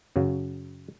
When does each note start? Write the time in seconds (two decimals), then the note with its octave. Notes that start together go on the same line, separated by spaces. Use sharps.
0.16 F#2 C#3 F#3